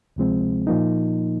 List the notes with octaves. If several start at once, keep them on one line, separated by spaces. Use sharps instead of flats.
D2 C3 F3 G#3 C4
A#2 F3 A#3 D#4